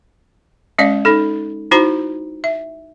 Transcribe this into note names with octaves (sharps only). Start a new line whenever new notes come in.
G#3 C#4 D5 D#5 F5
D#4 A4
D#4 E4 F#4 C5 A#5
E5